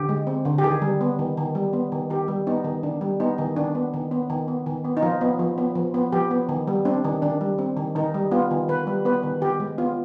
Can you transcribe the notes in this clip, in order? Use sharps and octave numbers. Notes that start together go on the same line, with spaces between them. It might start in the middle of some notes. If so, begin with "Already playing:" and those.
Already playing: D3 G4
G#3
C4
D3
G4
D#3 G#4
G3
B3
D#3
D#3
G3
B3
D#3
D#3 G4
G3
B3 D#4
D#3
D#3 D4
G3
B3 D#4
D#3
D#3 D4
B3
D#3
B3
D#3
B3
D#3
B3
D#4
F3 F4
B3
F3
B3
F3
B3
F3 G4
B3
D#3
G3
C4 D4
D#3
D#3 D4
G3
C4
D#3
D#3 D#4
G3
B3 F4
D#3
D#3 B4
G3
B3 B4
D#3
D#3 G4
G#3
B3 F4